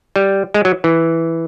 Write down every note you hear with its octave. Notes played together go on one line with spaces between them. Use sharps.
G3
G#3
F#3
E3